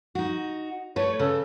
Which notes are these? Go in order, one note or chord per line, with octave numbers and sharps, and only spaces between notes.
D#4 F#4
A3 B4 C#5
C#3 A4